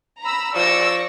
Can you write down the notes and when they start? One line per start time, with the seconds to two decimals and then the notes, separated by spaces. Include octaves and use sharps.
0.21 A#5 B5 E6
0.56 F3 D5 C#6 E6 A#6